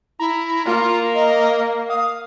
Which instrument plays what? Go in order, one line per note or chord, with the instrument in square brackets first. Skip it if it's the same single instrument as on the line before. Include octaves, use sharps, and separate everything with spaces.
[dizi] E4 [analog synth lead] A#5
[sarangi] A#3 [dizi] F4
[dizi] D#5
[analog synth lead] F5 [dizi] D#6